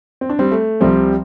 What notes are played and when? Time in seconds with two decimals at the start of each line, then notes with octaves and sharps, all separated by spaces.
0.21 C4
0.29 D4
0.39 G3 C4
0.51 A3
0.81 C2 C3 F3 G3 C4